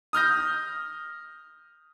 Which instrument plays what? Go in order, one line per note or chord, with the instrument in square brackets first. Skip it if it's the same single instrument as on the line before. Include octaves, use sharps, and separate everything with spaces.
[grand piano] D#6 F6 G6 A#6